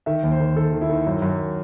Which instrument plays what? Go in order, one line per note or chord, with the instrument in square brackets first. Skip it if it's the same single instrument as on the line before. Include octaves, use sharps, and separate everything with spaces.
[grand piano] D#3 E5
D#2
C5
D#3
D#3 A4
D#3
E4
D#3
F#2
F#2